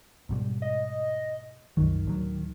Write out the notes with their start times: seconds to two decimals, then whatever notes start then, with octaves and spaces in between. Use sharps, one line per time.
0.29 G#2 B2 G3
0.62 D#5
1.77 C2 F#2 D#3 F#3
2.05 D1 A2 F#3